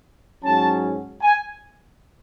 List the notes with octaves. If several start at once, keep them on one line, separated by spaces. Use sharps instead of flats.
G#2 F#3 C#4 A5
G#5